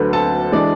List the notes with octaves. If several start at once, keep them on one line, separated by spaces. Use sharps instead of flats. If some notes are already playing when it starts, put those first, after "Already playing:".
Already playing: D2 D3 F#3 B4
A4 A5
E3 G#3 D4 D5